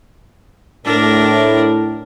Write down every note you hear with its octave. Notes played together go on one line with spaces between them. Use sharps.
A2 D4 A#4